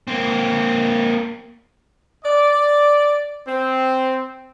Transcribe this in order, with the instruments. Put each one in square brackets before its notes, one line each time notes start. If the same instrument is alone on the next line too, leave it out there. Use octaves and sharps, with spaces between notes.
[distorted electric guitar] A#3 C4
[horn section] D5
C4